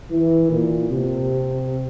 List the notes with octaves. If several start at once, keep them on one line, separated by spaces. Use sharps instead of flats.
E3
A#2
C3